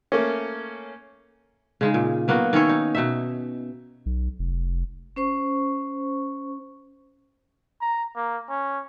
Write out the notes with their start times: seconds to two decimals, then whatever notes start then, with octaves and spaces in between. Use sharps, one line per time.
0.12 A3 A#3 C#4
1.81 C#3 G#3 D#4
1.94 A#2
2.28 F#3 A#3 B3 F#4
2.53 D#3 C#4 E4 C#5
2.69 D#4
2.95 B2 D#4 E5
4.06 B1
4.39 F1
5.16 C#4 C5 C#6
7.81 A#5
8.16 A#3
8.49 C#4